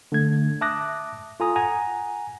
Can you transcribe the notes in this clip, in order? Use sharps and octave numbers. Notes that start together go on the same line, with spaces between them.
D3 A3 G#6
E5 A5 D6 D#6 F#6 A#6
F4 A4 G#5 A#5 D#6
F#5 G#5 A#5